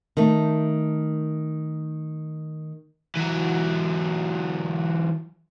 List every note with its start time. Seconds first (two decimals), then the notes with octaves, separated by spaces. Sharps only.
0.17 D#3 A3
3.15 E3 F#3